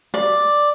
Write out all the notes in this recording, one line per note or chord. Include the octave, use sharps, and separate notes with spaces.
D5